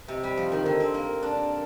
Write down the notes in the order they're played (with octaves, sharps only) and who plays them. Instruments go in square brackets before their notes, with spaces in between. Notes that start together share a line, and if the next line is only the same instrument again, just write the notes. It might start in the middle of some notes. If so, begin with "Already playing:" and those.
[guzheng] C3 [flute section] C5 D#5 G5
[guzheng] G3
F3
D#3
D3
C4
A#3
[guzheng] D4 [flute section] A#4 D5 A5